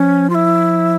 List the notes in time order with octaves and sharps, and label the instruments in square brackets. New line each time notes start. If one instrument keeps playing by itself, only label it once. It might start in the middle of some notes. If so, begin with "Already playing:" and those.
Already playing: [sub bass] F3 [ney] C#4
[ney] F4
E4